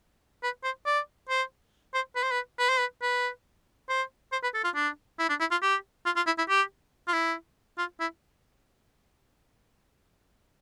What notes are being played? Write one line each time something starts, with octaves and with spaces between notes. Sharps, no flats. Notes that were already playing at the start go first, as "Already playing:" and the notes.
B4
C5
D5
C5
C5
B4
C5
B4
B4
C5
B4
B4
C5
C5
B4
A4
F4
D4
E4
D4
E4
F4
G4
F4
F4
E4
E4
G4
F4
E4
F4
E4